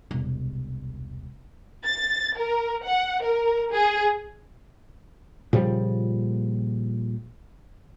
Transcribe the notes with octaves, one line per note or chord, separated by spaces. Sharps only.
E1 C2
A6
A#4
F#5
A#4
G#4
A#2 C#3 F3 G3